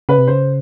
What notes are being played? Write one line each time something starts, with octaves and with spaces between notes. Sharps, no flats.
C#3 B4
C3
C#3 C5